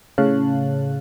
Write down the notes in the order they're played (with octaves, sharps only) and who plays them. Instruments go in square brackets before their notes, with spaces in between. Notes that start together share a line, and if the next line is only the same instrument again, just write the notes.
[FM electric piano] A2 C#3 C#5 F5 A5 F#6